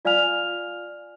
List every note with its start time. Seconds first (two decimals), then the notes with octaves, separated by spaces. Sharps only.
0.05 F4 D5 F5 G#5 F6 F7